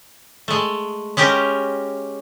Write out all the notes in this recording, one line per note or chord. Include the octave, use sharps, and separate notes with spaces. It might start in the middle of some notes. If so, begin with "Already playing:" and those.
G#3 A3
G#3 C#4 G4 A#4